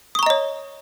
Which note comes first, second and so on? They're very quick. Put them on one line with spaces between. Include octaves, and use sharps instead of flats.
D#6 C#6 A#5 D#5 C#5